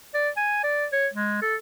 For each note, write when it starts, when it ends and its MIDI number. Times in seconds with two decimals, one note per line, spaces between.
0.14 0.30 74
0.37 0.61 80
0.64 0.86 74
0.92 1.07 73
1.14 1.42 56
1.42 1.56 69